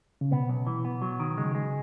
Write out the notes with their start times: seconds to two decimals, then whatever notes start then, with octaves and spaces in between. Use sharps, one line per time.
0.21 C#3
0.31 B2 B3
0.49 B1
0.67 E3
0.85 B3
1.02 F#3
1.20 D#3
1.37 C#3 G#3
1.55 G#3